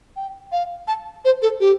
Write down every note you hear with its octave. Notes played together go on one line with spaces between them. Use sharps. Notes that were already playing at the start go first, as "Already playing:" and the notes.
G5
F5
A5
C5
A4
G4